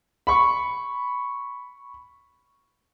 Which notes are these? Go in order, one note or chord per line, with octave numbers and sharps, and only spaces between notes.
B5 C#6